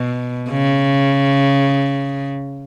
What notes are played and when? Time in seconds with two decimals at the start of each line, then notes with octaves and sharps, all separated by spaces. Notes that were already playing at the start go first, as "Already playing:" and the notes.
Already playing: B2
0.50 C#3